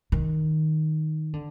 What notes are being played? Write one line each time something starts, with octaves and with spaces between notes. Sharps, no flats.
D#3
D3